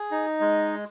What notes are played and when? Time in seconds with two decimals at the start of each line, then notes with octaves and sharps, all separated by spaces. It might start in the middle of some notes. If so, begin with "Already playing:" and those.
Already playing: G#4
0.11 D#4
0.40 G#3